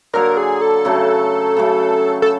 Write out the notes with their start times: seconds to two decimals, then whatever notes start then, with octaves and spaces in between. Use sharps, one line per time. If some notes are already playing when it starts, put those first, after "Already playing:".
0.13 D3 F#3 A#3 A#4
0.37 G#4
0.62 A4
0.85 C#3 F#3 A3
1.57 C#3 F#3 A3
2.22 A4